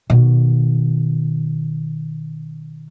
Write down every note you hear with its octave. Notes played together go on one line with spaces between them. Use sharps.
B2 D#3